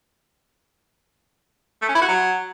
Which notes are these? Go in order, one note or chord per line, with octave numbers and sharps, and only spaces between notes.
A3
C#4
E4
F#4
F#3